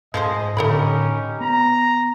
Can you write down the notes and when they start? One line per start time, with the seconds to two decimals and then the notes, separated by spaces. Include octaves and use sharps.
0.14 G#2 F3 A3 G#4 C5 D#5
0.57 A2 D3 C#4 D#4 G4 A4 A#4 B5
1.41 B3 A#5